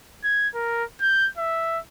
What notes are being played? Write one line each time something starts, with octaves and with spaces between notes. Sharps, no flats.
G#6
A#4
G6
E5